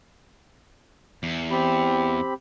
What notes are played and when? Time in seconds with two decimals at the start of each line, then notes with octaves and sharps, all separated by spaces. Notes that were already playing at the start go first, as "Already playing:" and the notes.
1.23 E2
1.51 C4 G4 B5